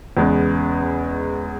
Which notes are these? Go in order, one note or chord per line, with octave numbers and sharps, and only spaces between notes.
E2 C#3 G#3 B3